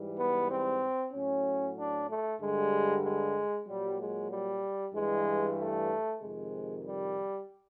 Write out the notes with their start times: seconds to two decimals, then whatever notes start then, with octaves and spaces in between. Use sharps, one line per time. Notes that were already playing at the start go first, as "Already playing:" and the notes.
Already playing: G#2 E3 G3
0.19 B3
0.50 C4
1.14 A2 F#3 C#4
1.77 D4
2.08 A3
2.41 G2 D3 G3 G#3
3.05 G#3
3.67 A#2 F#3 G3
3.99 G#3
4.31 G3
4.94 G2 E3 G3 G#3
5.58 A3
6.22 F2 C3 D#3 G#3
6.85 G3